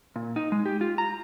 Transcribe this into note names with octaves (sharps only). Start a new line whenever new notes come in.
A#2
D#4
G#3
G4
F4
A#5